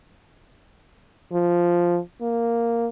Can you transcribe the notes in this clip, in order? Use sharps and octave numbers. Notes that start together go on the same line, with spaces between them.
F3
A#3